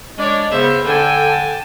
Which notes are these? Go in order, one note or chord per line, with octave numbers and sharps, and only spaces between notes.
G#3 D4 C#5 D5
C#3 B3 C5 E5
D3 D4 A4 G5 G#5
A5